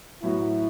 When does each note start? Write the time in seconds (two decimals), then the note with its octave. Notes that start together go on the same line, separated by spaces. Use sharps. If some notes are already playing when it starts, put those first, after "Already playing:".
0.23 A2 F#3 B3 E4 F#4